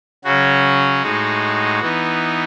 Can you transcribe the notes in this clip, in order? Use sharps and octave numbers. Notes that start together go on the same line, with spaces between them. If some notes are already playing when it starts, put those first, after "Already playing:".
C#3 F#3 C#4 F#4
A2 G#3 D#4
E3 B3 D#4